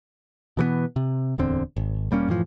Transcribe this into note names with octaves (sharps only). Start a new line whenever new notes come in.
B2 E3 F#3 B3
C3
D1 E2 D3 C4
G#1
E1 G3 A#3 C#4
F#2 A2 E3 F3